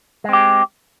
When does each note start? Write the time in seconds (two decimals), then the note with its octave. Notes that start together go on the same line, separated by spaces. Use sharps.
0.24 G#3
0.29 C4
0.33 G4